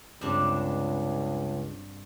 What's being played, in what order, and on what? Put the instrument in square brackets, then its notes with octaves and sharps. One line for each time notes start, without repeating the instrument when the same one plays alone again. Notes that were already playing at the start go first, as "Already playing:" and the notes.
[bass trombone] C#2 [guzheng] G2 C3 D4